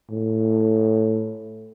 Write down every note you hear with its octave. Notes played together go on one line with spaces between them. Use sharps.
A2